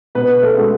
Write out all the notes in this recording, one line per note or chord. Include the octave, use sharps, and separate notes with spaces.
B2 B3 B4
A3 A4
G#3 C#4 F#4